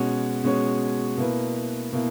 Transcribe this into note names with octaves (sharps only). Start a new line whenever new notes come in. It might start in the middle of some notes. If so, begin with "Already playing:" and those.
Already playing: B2 G#3 C#4 F#4 C#5
B2 G#3 C#4 F#4 C#5
B2 A#3 E4 B4
B2 A#3 E4